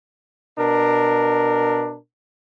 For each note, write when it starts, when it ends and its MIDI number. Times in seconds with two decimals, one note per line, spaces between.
0.57 1.97 47
0.57 1.97 62
0.57 1.97 70